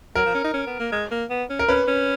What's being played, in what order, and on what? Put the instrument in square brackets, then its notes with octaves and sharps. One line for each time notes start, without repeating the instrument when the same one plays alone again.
[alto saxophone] F#3 [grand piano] A#4
[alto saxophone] F3
C#4
D#4
C#4
B3
A#3
G#3
A#3
B3
C#4
[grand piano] A#4
[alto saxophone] C#4 [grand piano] B4
[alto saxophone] C#4